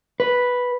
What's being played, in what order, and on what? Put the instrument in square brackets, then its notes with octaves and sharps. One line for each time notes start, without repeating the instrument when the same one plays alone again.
[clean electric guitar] B4